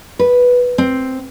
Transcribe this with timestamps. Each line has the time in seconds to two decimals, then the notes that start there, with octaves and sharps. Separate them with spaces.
0.19 B4
0.78 C4